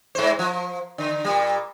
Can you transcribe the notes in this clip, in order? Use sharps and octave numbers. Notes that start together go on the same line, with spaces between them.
G#2 C5
F3
D3
A#2 G3